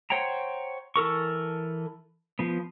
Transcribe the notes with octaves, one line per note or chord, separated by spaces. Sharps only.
C5 C#5 F#5 G5 A#5
E3 A4 A#4 C#6
F3 B3